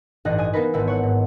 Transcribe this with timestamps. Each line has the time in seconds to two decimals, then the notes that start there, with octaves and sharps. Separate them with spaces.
0.25 A1 G2 D#4 D#5 F#6
0.38 G#5 D#6 D#7
0.53 A#3 B3 D#4 A#4 B4
0.74 G#1 B3 E4
0.88 C#5 F#5
1.03 G#2